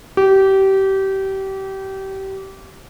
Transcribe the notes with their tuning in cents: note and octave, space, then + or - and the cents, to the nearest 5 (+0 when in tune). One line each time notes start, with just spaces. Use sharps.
G4 -25